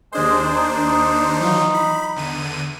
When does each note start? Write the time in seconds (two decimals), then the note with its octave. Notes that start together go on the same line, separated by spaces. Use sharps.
0.12 D#2 G#3 D4 C5
0.44 D#4
1.40 E3 F#3 F4
1.74 B5
2.16 E2 D3 D#7